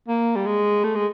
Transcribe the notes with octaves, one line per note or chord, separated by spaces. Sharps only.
A#3
G3
G#3
A3
G#3